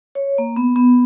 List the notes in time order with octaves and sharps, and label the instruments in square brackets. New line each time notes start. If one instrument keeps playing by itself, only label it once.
[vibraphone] C#5
A#3
B3
B3